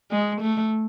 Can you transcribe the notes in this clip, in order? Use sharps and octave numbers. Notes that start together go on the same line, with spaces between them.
G#3
A3